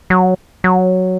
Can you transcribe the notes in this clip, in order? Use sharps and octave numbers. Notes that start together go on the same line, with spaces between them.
F#3
F#3